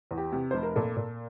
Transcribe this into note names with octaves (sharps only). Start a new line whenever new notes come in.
E2
G4
C3
F1 C5
A#4
A#2 A4
A#2